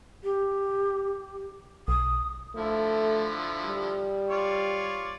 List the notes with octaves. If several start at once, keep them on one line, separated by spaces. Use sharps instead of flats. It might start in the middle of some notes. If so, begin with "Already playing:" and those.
G4
B1 D#6
D3 F3 A3 E4
G3
F4 C#5 D5